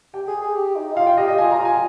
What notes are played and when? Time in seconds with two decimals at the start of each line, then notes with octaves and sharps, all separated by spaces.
0.14 G4 G5
0.27 G#4
0.42 G#4
0.55 G4
0.76 D#4
0.96 F4 F5
1.07 G5
1.17 G4 D#5
1.28 G4 D#5
1.38 F4 G#5
1.52 A#5
1.59 F4
1.65 G#5